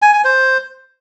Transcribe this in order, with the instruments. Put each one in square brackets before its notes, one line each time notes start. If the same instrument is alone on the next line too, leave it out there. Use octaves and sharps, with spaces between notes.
[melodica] G#5
G#5
C5